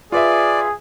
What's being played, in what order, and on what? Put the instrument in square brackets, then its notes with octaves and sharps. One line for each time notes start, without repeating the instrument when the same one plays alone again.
[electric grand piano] F4 B4 E5 [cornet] G#4 [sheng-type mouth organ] D5